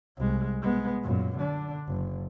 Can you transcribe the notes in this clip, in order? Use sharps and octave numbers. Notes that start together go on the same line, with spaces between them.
C2 G#3
G#3 B3
F#2 A#2
D3 D4
F#1